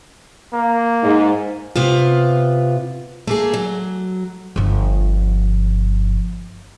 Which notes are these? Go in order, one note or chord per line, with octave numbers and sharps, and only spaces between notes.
A#3
G#2
C3 B3 F4
A3 A#3 G#4
F#3
G1 F3